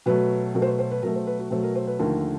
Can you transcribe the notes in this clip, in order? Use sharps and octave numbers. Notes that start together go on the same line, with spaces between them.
B2 F#3 A3 B4
B2 F#3 A3 A#4
C5
B4
C5
B4
B2 F#3 A3 A#4
C5
B4
F#4
B2 F#3 A3 C5
A#4
C5
B4
D#2 D3 F3 A3 A#4